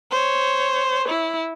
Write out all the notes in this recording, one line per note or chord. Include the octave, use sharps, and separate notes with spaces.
C5 C#5
E4